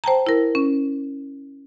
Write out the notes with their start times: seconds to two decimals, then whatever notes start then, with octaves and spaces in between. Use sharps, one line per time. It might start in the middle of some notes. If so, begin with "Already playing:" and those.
0.04 C5 G5 A5 A#5
0.27 E4 A#4
0.55 C#4